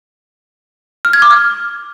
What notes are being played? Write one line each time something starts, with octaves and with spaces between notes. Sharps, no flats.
F6
G#6
D6
F6